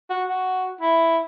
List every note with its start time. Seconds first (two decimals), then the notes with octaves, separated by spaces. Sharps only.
0.10 F#4
0.28 F#4
0.81 E4